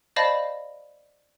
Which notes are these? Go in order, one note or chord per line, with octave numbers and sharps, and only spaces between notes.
C5 D5 D#5 F5 A5 B5